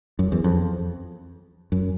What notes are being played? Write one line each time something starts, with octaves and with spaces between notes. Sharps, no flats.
F#2
E2
F2
F#2